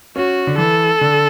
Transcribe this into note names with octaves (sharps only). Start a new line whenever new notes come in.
C#4 F#4
D3
E3 A4
D3